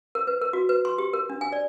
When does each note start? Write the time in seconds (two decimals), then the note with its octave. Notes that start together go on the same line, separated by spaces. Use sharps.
0.15 A#4
0.27 B4
0.42 A#4
0.53 F#4
0.69 B4
0.85 C6
0.98 G4
1.13 A#4
1.30 D4
1.41 G#5
1.52 D5